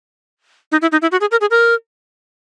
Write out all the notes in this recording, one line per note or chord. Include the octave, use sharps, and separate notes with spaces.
D#4
E4
D#4
E4
F#4
G#4
A#4
G#4
A#4